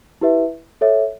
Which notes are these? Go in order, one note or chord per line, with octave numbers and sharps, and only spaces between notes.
E4 G4 B4 E5
A4 C#5 E5